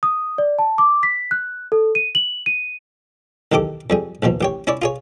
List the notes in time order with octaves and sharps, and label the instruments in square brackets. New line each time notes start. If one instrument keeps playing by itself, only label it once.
[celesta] D#6
D5
A5
D6
B6
F#6
A4
D#7
F#7
D#7
[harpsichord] B1 E2 D#3 G4 A4 D6
F2 G3 G#4
A#1 D#2 B2 F3
A1 G4 C#5
C#4 E4 C#5 D5
F4 G#4 C#5